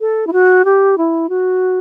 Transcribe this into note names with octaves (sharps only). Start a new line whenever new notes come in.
A4
E4
F#4
G4
E4
F#4